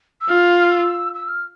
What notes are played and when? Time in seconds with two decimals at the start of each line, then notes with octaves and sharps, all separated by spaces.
0.21 E6
0.29 F4 F6
0.71 E6
1.14 E6
1.28 F6